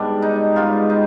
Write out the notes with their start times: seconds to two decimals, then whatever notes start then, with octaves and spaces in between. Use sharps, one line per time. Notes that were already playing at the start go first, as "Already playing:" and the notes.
Already playing: G#2 G3 B3 D4
0.22 D#4
0.56 G#2 G3 B3 F4
0.90 D#4